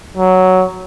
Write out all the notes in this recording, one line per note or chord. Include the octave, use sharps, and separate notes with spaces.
F#3